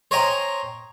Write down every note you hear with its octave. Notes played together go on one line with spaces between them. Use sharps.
C5 C#5 D#5 G5 G#5 A#5